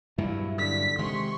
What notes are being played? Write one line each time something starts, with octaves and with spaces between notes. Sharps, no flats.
G2 A#2 F#3 E4
D3 B6
C3 D#3 G#3 C6 C#6